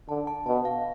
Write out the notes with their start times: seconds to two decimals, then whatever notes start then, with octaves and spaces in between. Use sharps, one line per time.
0.09 D3 A5
0.27 A5
0.46 B2 A5
0.65 F5